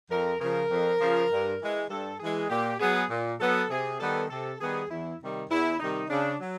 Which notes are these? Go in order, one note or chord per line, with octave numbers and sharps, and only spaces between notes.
F2 A#4
C#3 F3 A#4
F2
C#3 F3
G2
E3 G#3
G2 A4
E3 G#3 G#4
A#2 G4
F#3 B3 G#4
A#2
F#3 B3 A4
C3 G#4
D#3 G3 B3 A4
C3 A4
D#3 G3 B3 G#4
E2 E4
C3 D#3 G3
E2 E4
C3 D#3 G3 D#4
C#3 D4
F#3